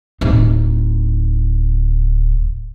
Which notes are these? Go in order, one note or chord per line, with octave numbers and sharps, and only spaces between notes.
D1 D#4